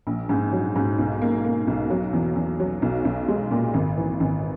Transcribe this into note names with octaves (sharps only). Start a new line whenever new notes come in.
A#1
G#2
F#3
G#2
B1
A#3
A#3
B1
F#3
E2
E2
F#3
B1
B1
G#3
A#2
G#1
E3
G#1